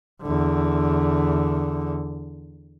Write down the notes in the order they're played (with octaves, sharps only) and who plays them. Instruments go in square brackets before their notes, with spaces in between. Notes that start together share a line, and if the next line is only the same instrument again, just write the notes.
[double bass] E2 D3